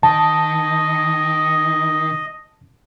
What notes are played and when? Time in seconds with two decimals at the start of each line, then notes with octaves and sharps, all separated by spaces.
0.03 D#3 D#5 A5